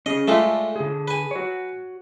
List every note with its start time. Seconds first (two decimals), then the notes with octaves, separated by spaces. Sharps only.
0.06 C#4 G#4 D#5
0.28 G#3 A3 F4 A4 D5 E5
0.76 D3 G#4
1.08 B4 G#5
1.31 F#4 C#5